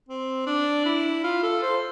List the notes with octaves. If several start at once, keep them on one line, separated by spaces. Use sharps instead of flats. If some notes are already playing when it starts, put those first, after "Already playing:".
C4
D4
E4
F4
A4
C5